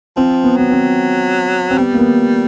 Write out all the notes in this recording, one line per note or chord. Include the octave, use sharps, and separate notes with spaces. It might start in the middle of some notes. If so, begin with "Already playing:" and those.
F3 C4
B3
F#3 B3
C4
C4
G3 B3
A#3
B3